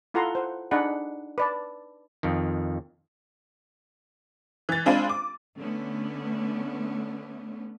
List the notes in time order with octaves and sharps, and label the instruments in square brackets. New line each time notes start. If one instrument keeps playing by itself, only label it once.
[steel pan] E4 F4 A4 F#5 A#5 C6
C5 F#5
D4 D#4 G#4 F#5 B5
B4 D5 A5
[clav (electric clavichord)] F2 D#3
[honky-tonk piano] E3 A6
G#3 C4 D4 F4 B5 D#7
D6
[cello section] D3 A3 B3 C#4